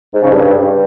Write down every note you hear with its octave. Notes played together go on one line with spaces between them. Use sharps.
G#2
C#3
G2